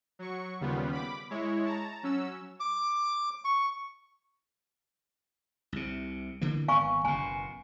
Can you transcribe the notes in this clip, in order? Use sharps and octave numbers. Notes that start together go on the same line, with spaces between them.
F#3 C#6
D#2 C#3 G3 B3 F4
B5 D6
G#3 E4 C#5
A5 A#5
F#3 C#4 E6
D6
C#6
C2 C3
D3 E3 A#3
G#1 B3 F5 G#5 C#6
F#1 B2 G#5